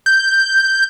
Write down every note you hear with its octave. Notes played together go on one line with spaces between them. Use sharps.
G6